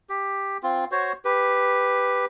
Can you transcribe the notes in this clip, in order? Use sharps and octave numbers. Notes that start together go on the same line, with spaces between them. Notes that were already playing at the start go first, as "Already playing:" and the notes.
G4
C4 F4
F#4 C5 C#5
G4 B4